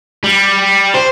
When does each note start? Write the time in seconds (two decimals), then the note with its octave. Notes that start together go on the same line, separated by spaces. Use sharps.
0.24 G3
0.94 C5